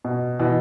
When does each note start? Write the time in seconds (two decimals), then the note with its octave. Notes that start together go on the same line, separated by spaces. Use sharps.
0.05 B2
0.39 B2 E3